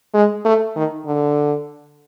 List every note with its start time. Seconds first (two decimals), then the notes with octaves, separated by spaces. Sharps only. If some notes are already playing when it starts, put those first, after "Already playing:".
0.14 G#3
0.45 A3
0.76 D#3
1.06 D3